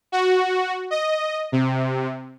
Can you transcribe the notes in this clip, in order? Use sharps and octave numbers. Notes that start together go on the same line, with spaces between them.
F#4
D#5
C3